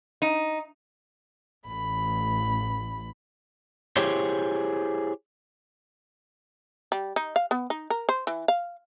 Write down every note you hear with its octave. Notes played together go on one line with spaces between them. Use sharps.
D#4
A1 B5
E4 G4 G#4 C5 C#5
G3
D#4
F5
B3
D#4
A#4
C5
E3
F5